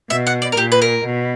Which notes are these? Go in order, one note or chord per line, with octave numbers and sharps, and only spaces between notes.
B2 E5
F#5
D5
A#4
A#2 G4
B4
A#4
B2